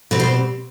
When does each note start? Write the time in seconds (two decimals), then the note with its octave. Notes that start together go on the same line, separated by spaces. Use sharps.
0.11 B2 G3 C4 B4
0.20 C5